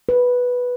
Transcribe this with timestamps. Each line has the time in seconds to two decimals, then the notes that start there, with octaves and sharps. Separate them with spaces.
0.09 B4